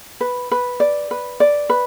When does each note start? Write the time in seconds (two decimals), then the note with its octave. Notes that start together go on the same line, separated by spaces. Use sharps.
0.21 B4
0.51 B4
0.80 D5
1.11 B4
1.40 D5
1.70 B4